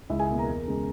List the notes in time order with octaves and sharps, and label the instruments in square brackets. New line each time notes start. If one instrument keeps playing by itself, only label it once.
[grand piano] C#2 E4 E5
G#4 G#5
B2 A#3
A#4 A#5
E2
C#3 G#3